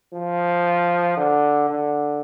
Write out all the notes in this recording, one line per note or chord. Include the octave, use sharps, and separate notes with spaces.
F3
D3
D3